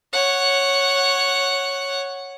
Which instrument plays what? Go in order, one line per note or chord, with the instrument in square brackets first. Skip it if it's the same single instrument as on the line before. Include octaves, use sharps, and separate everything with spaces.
[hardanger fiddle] C#5 F#5